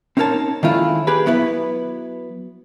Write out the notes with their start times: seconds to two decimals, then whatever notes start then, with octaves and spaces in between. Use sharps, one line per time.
0.17 C4 C#4 D#4 A#4 C#5 A5
0.63 D#3 G#3 A3 C#4 E4 F4
1.07 G4 G#4 B4
1.26 F#3 B3 E4 B4